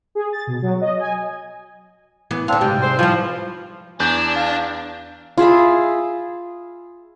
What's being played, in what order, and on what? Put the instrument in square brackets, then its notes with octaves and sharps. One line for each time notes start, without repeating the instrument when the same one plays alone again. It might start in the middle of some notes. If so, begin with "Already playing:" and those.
[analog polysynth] G#4
A6
B2
F#3
D#5
G#5
[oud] E3 B3
[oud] D3 F5 [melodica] C4 D4
[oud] G#2 C3 G3 [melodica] G5
[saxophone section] G#3 C4 C5
[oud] E3 G3 [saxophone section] F3
[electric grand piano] E2 G6 [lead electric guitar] D4 [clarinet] G#5
[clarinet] F5
[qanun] F4 G#4 E5 B5